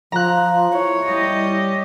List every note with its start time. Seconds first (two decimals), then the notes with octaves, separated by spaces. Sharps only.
0.12 F3 A#5 F#6
0.73 E4 C#5
1.06 G3 G4 D#5